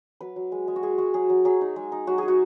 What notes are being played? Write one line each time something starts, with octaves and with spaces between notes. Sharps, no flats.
F#3 B4
F#3
G#3
G#3
F#4
G#3 G#4
G#3 F#4
F#3 G#4
F#3
F#3 G#4
D#4
G#3
D#4
F#3 F#4
G#4
D#4
F#4